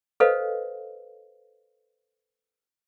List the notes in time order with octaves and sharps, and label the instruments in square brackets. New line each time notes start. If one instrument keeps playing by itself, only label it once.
[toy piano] A4 B4 C5 D#5 F5